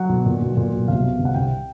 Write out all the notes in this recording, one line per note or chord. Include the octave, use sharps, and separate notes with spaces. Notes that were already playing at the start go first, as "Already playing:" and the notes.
Already playing: F#3 F#5
B1
A#2
B1
A#2
B1
C2 F5
B2
C2
F#5
C2 G5